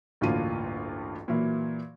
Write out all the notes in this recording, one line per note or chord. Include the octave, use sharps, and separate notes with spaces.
A1 D2 G2 A#3 F4 D#7
A#2 E3 F#3 A#3